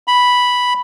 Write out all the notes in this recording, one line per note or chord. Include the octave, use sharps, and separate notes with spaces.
B5